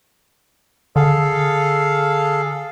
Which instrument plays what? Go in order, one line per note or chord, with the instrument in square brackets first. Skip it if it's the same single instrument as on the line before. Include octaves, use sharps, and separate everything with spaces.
[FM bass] D3 [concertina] G#4 A4 F5